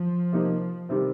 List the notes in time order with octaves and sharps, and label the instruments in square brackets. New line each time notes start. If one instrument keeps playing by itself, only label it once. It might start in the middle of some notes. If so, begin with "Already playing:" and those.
Already playing: [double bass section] F3
[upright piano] C3 D#3 A#3 D#4
C3 D#3 G3 C4